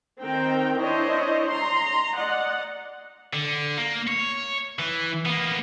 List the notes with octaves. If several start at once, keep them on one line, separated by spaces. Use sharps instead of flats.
D#3 C4 A#4 G5
D4 E4 C5 C#5 D#5
A#5 C6
D5 D#5 F#5
D3
A#3
C#5
E3
A#3 B3